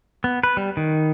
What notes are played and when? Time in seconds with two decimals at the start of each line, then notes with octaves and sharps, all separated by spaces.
0.24 B3
0.43 B4
0.57 G3
0.77 D#3